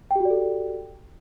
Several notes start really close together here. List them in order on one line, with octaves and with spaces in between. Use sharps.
G5 G4 F#4 D5 A4